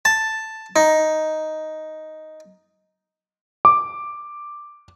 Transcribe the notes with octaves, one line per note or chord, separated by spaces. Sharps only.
A5
D#4
D6